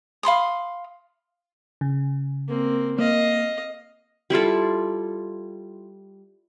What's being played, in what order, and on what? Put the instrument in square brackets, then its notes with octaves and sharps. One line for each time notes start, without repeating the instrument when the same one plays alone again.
[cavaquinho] F5 B5 C6 D#6
[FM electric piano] C#3
[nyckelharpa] A#3 C4
[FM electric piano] A#3 [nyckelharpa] D#5 F5
[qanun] G3 E4 F4 A4